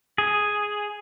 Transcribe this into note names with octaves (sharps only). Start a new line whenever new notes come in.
G#4